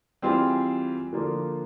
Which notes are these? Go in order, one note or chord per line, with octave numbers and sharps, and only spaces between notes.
E3 G3 C4 F4 G#4
D3 F3 A#3 D4 F4